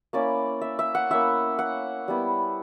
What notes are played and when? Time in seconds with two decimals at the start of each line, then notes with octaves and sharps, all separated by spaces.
0.13 A#3 C#4 E4 D5
0.61 E5
0.79 E5
0.95 F#5
1.10 A#3 C#4 E4 E5
1.59 F#5
2.08 G3 B3 E4